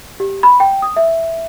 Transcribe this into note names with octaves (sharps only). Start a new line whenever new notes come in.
G4
B5
G5
D#6
E5